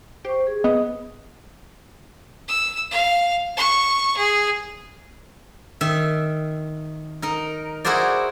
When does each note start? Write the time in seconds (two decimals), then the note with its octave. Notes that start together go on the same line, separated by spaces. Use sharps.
0.25 G4 C5 C#6
0.47 G#4
0.64 B3 D#5
2.48 E6
2.91 F5
3.57 C#6
4.17 G#4
5.81 D#3 E5
7.22 D#4 A#4
7.85 E4 F#4 G#4 A#4 C5 D5